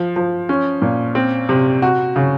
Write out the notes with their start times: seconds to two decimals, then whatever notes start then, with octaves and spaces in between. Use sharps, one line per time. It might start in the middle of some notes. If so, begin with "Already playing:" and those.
Already playing: F3
0.16 F3
0.49 C#4
0.82 A#2
1.15 C4
1.49 C3
1.82 F#4
2.16 C#3